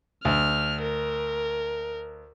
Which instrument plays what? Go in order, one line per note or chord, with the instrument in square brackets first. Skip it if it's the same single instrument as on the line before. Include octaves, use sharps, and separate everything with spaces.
[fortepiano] D2 [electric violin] F6
[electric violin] A#4